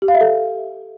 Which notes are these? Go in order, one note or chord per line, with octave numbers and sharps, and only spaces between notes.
G4
F5
E5
A4